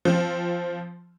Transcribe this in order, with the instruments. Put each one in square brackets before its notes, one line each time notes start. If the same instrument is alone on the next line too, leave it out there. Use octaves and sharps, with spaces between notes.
[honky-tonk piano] F3 C4